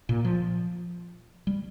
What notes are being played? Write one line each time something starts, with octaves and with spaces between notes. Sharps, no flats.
A#2
F3
G3